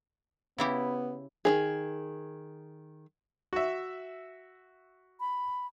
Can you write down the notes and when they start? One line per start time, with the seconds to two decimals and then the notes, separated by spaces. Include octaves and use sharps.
0.58 C#3 B3 E4 G4
1.45 D#3 F#3 G#4
3.53 F#4 E5
5.20 B5